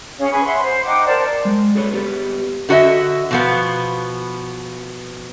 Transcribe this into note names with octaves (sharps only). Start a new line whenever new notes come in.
C#4 G#4 C#5 F5
G#4 B4 B5 C#6
E5 F#5 B5 C6
C5
D#4 F#5 G5 D6
A#4 C5 D5 A5
G#3
G#4 A4 B4 C#5
B3 G4 D5
D3 F#4 G#4 D#5 E5
B2 F3 B3